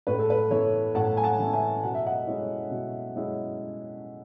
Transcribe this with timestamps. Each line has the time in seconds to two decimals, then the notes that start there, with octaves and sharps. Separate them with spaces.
0.07 A2 B4
0.19 A4
0.30 B4
0.51 E3 B3 E4 A4 C#5
0.95 A2 F#5 A5
1.17 G#5
1.24 F#5 A5
1.39 E3 B3 E4
1.53 E5 G#5
1.83 B2 F#5
1.94 E5
2.06 D#5 F#5
2.27 G#3 C#4 E4
2.71 B2
3.16 G#3 C#4 E4